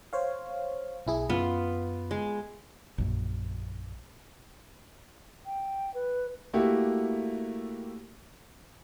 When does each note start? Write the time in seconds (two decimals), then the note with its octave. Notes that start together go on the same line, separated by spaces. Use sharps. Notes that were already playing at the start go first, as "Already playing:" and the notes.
0.13 C5 C#5 F5
1.07 B1 E4 G#4
1.29 F#2 B3 F4
2.11 G#3
2.98 A#1 F#2
5.46 G5
5.94 B4
6.53 A3 A#3 E4 F#4 G4